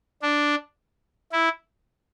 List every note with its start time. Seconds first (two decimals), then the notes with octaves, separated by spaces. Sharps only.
0.22 D4
1.32 E4